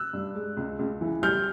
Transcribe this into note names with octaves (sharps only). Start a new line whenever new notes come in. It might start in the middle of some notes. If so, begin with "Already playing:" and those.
Already playing: E6 F#6
G2
G#3
C#2
C#2
E3
G3 F6 G6